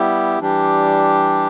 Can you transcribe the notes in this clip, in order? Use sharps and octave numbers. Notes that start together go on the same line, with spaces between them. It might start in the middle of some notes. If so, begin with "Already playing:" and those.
Already playing: G3 B3 E4 G4
E3 G3 D4 G4